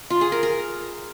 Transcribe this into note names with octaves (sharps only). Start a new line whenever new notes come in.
F4
G#4
A#4
A#4